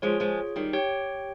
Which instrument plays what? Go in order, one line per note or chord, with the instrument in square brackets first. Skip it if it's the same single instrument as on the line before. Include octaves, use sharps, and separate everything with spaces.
[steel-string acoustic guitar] F3 G#3 [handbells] F4 G#4 C#5
[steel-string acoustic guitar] F3 G#3
D#3 G3
[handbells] G4 C#5 G5